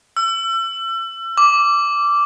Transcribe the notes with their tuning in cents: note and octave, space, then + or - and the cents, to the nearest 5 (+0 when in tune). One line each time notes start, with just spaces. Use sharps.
E6 +35
D6 -10